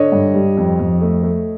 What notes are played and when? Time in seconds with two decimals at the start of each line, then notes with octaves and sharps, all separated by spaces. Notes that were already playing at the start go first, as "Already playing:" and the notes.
Already playing: D3 C#5 D#5
0.12 G2
0.34 G3
0.57 F2
0.79 F2
1.01 A3
1.23 A3